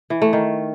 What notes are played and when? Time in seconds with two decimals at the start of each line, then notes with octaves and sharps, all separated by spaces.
0.10 E3
0.22 A3
0.33 D#3